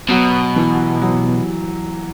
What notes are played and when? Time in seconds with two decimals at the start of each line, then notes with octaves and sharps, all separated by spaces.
0.09 B2 F#3
0.56 E3
1.02 F#3